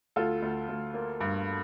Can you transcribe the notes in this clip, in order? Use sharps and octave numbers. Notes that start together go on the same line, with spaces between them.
D2 F4 A4
D2
D2
A#3
G2